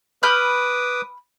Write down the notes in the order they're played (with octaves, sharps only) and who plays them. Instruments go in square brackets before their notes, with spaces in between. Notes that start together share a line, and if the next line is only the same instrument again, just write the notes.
[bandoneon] B4 D6 D#6 [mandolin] B5 F6 G6